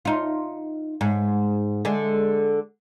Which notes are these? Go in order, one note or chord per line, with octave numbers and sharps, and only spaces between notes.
D#4 F4
G#2
D3 G#3